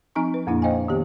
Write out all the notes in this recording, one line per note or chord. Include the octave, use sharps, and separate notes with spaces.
F3 C4 D#4 G#5 A#5 C#6
B4
F2 A#2 A#3 D4 E4
C5 D#5 F5 G5 G#5
D#3 B3 G4